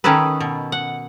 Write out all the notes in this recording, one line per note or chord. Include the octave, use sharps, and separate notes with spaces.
D#3 C#4 D#4 A4 B4
B2
F#5